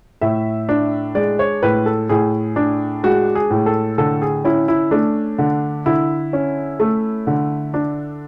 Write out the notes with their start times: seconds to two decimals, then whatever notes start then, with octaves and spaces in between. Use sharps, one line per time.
0.21 A2 E5
0.69 D4
1.15 G#3 D5
1.39 C#5
1.62 A2 B4
1.86 A4
2.09 A2 G#4
2.56 D4
3.04 G#3 F#4
3.35 G#4
3.51 A2
3.66 A4
3.98 D3 A4
4.22 G#4
4.45 C#4 E4
4.68 E4
4.91 A3 D4
5.38 D3
5.86 D3 E4
6.33 C#4
6.80 A3
7.27 D3
7.74 D4